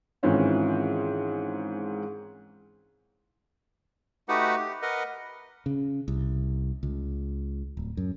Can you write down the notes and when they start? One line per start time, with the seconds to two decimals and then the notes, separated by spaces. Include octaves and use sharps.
0.23 G#2 D#3 E3 C4 C#4 F4
4.29 A3 D#4 F#4 G4 B4 F#5
4.56 G4
4.82 A#4 B4 D#5 F#5
5.66 C#3
6.08 C2
6.83 C#2
7.77 D1
7.97 F#2